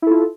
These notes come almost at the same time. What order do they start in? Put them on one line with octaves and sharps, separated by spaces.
E4 A4 F4